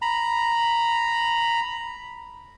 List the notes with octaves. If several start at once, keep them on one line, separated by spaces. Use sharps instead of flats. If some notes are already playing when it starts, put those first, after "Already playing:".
A#5 B5